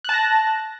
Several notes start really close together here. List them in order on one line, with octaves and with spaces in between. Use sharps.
F#6 A5 A#6